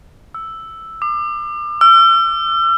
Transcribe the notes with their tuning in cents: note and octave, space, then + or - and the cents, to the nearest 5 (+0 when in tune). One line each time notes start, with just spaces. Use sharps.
E6 +0
D6 +35
E6 +45